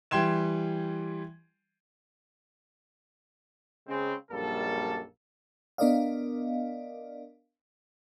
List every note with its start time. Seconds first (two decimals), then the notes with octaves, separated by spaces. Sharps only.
0.11 E3 G3 G5 C6 G#6 E7
3.86 C#3 G#3 C4
4.31 A#1 F#2 G3 A#3 A4 A5
5.78 B3 D4 A#4 D5 D#5 F5